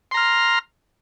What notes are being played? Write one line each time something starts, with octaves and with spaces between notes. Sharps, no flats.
A#5 C6 F6